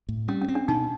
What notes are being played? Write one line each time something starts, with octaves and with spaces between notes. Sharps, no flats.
A2
G3 C#4
C#4
C4
D4
B2 D#4